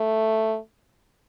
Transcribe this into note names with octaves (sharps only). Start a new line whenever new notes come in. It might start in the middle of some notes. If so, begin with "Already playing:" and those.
Already playing: A3